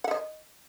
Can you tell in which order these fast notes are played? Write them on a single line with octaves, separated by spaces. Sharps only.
F#5 E5 D#5